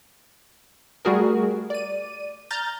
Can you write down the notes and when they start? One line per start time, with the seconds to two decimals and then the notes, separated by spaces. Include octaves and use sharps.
1.05 G3 A3 F#4 G#4 A#4
1.70 D5 D#7
2.51 A#5 F6 G6 A6